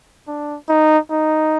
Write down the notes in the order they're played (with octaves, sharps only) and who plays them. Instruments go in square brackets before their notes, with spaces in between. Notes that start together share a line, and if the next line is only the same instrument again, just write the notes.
[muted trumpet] D4
D#4
D#4